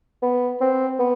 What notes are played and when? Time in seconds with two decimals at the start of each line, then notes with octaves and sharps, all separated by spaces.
0.22 B3
0.61 C4
0.99 B3